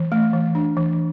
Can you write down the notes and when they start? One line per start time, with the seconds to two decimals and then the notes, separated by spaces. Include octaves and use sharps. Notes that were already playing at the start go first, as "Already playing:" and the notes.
Already playing: E3
0.12 A3
0.33 E3
0.55 D4
0.77 E3